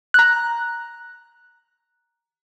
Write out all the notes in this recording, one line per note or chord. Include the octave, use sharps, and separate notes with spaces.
A#5 F#6